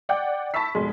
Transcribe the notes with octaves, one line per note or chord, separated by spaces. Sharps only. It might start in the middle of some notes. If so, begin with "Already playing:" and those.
D5 F#5 G5 D6 G6
A5 B5 C#6 E6 B6
F1 B2 G#3